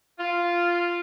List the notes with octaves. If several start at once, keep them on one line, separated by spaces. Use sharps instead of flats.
F4